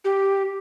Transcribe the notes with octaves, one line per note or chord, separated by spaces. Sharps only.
G4